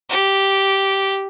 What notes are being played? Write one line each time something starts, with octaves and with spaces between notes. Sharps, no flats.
G4